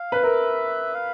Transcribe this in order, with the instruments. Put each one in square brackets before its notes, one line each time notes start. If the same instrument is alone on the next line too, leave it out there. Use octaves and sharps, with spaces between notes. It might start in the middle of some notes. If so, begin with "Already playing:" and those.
Already playing: [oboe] F5
[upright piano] B4
[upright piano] A#4 [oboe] E5
[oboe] F5